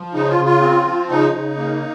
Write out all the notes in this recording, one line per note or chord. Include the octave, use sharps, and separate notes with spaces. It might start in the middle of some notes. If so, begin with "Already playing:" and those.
Already playing: F3
C#3 D#4
F4
C#3
F4
C4
F3
C#3 D#4
C#3
A#3